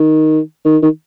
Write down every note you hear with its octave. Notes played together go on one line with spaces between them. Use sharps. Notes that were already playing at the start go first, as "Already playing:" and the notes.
Already playing: D#3
D#3
D#3